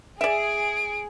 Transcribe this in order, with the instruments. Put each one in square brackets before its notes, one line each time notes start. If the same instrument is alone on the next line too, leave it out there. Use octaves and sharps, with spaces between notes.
[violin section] G#4 [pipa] D5 E5 [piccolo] D7